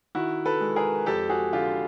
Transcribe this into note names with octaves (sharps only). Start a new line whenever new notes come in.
D#3 E4 F#4
A4 B4
G#3
G#4 A#4
F2 G4 A4
F#4 G#4
D3 F4 G4